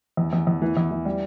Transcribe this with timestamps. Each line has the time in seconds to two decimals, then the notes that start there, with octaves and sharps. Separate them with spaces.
0.17 E2
0.33 E2
0.47 E2
0.62 E3
0.77 E2
0.91 E3
1.05 G3